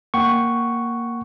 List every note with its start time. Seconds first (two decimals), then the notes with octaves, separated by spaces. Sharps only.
0.14 A#3 F#5 G5 C#6